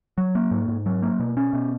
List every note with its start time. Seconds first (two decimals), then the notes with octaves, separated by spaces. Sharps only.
0.18 F#3
0.35 A#3
0.51 G#2
0.68 G#2
0.86 F#3
1.02 A#3
1.19 B2
1.37 C#4
1.53 B2